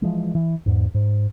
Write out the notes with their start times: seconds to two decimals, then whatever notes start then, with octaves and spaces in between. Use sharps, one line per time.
0.02 E3 F3 G#3
0.35 E3
0.66 E2 G#2
0.94 G#2